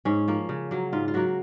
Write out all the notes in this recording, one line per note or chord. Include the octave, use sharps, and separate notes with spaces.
G#2 C#4
F3 A#3
C#3
F#3 A#3
G#2 F4
F4
F#3 A#3 F#4